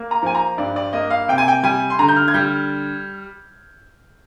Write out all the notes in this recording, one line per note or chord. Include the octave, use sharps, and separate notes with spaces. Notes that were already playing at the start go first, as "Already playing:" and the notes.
Already playing: A#3
A#5
F3 G#5
A#5
G2 D5
D5
A#3 D#5
F5
C3 G5
G#5
G5
G3 G#5
C6
D3 A#5
G6
F6
G#6
G3 G6